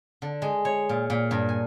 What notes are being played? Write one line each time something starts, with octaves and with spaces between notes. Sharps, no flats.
D3
G#3
C#5
A#2
A#2
G2
G#5